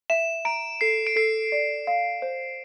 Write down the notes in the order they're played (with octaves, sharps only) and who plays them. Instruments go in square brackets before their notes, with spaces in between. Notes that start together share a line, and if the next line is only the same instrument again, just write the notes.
[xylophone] E5 [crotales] E7
[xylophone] A#5 [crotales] D7
[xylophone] A4 [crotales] C7
[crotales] D7
[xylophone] A4 [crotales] C7
[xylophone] D5
F5
C5